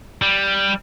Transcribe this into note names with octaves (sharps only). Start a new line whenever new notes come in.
G3